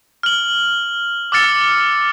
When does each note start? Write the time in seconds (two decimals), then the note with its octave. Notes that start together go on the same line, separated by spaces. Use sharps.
0.23 F6 F#7
1.32 D6 E6 F6 A6 C#7